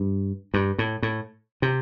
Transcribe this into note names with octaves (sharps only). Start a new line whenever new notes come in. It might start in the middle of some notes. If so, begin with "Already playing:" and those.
Already playing: G2
G2
A2
A2
C3